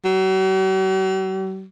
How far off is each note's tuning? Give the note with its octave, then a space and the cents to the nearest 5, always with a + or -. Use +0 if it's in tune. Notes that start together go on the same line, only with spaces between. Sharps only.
F#3 +45